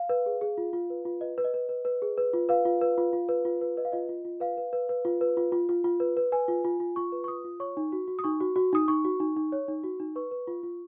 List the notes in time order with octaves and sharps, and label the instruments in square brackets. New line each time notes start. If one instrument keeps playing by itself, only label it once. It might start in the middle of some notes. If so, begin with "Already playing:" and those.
Already playing: [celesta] F5
B4
G#4
G#4
F4
F4
B4
F4
B4 D#5
B4
D#5
B4
B4
B4
G#4
B4
F4
B4 F5
F4
B4
F4
F4
B4
F4
B4
B4 D#5
F5
F4 D#5
F4
F4
B4 F5
B4
B4
B4
F4
B4
F4
F4
F4
F4
B4
B4
B4 G#5
F4
F4
F4
F4 C#6
B4
C#6
F4 D#6
F4
C#5 C#6
D#4
F#4
F#4
D#6
D#4 C#6
F#4
F#4
D#4 D#6
D#4 C#6
F#4
D#4
D#4
C#5
D#4
F#4
D#4
B4 C#6
B4
F4
F4